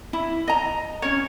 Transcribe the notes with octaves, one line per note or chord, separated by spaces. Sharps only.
E4
D#5 A#5
C#4 C#5